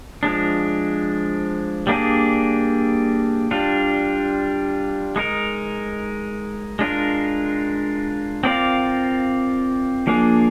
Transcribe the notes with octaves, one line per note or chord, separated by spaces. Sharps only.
F3 G#3 D4
G3 A#3 D4 G#4
G3 D4 F4
G#3 D#4 A#4
G#3 D4 F4 A#4
C4 F4 A#4 D5 F5
F3 A#3 D4 G#4